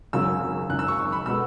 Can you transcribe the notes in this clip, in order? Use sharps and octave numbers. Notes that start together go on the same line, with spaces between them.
G#1 F#2 C#3 F#3 C#4 E6
G#1 F#2 C#3 F#6
E6
C#6
C#6
B5
B2 G#3 B3 F#4 A4 E6